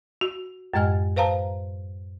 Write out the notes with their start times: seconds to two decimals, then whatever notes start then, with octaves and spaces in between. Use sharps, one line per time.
0.21 F#4
0.74 F#2 A2 G#3 D#5 G#5 F6
1.16 B4 C5 F5 A5 A#5